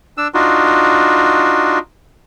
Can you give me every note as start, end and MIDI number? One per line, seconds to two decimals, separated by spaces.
0.18 0.28 62
0.18 0.28 88
0.34 1.79 62
0.34 1.79 63
0.34 1.79 65
0.34 1.79 66